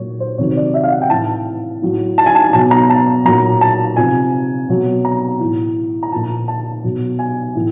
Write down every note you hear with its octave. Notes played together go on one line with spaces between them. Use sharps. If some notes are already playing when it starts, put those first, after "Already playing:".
Already playing: A#2 F#3 C#5
C5
C3 D#3 F#3 C#5
D5
E5
F5
F#5
G5
A2 E3 A5
A2 F#3
A5
G#5
A5
B2 F#3 A5
A#5
A5
A#2 F#3 A#5
A5
C3 F3 G#5
B2 F#3
A#5
A2 E3
A#5
A#2 F3 A5
A5
B2 F#3
G#5
A2 E3